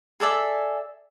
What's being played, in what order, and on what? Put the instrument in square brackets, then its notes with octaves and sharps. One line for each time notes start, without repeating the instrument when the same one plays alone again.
[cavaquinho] G#4 A4 D5 E5